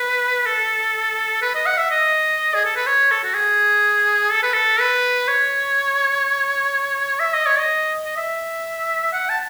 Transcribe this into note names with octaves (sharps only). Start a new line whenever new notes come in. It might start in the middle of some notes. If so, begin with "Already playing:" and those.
Already playing: B4
A4
B4
D#5
F#5
E5
D#5
G#4
A4
B4
C#5
A4
F#4
G#4
A4
B4
A4
B4
C#5
E5
D#5
C#5
D#5
D#5
E5
F#5
A5